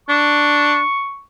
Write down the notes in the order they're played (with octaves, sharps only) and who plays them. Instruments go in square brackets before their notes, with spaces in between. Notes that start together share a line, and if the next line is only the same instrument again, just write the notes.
[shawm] D4 [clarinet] C#6